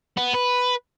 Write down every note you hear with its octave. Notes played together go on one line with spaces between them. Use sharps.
B3
B4